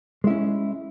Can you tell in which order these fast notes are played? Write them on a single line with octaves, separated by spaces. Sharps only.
G#3 E4 C#4